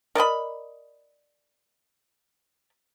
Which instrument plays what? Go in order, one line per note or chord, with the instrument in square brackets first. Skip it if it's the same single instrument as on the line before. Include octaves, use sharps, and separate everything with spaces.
[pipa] A#4 D5 D#5 B5